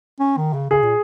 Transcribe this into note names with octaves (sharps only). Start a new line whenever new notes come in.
C#4
D#3
C#3
C#3 G#4
A#2